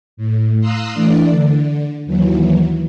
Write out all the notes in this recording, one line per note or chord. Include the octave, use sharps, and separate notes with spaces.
A2
F5 A#5 C6 D#6 E6 F#6
E3 A3 D4 D5
D3
D#2 E3 F#3